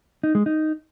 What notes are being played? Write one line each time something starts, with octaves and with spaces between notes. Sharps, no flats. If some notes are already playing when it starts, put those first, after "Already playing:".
D#4
G#3
D#4